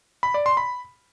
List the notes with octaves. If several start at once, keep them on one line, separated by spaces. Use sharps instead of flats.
B5
D5
C6
B5